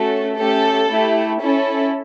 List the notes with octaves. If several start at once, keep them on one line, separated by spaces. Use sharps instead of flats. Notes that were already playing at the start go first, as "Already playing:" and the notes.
Already playing: A3 C#4 F#4 A4
A3 C#4 G4 A4
A3 E4 G4
C#4 E4 A4